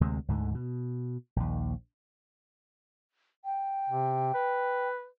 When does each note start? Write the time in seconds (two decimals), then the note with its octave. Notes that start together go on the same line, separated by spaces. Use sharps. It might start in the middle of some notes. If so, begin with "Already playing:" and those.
0.01 D2 C3 G#3
0.28 D2 G#2 D3
0.55 B2
1.36 A#1 D#2
3.45 G5
3.89 C3
4.34 B4